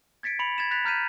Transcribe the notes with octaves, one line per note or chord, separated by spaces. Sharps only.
G#6 A6 B6 C#7 D7
B5 C#7 F7 F#7
G#6 A6 B6 E7
F#6 A6 B6 F7
A#5 F6 G6 B6 D#7 E7